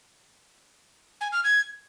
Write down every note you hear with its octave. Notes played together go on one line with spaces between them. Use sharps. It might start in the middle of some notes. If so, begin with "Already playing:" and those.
G#5
F6
G#6